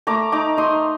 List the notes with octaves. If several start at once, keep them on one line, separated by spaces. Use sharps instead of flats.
A3 A#5 D6
D#4 A#5 D6
D#4 C6 D#6